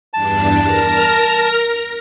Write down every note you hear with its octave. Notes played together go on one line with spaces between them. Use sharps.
E2 G2 D4 A5
A#4 F6 A#6